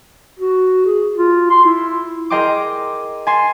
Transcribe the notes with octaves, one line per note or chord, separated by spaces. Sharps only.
F#4
G#4
F4
C6
E4
G#4 A#4 D#5 G5 C6 D6
G#5 A5 C6 C7